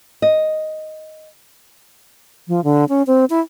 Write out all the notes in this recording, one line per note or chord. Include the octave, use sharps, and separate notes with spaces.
D#5
F3
D3
C#4
C4
E4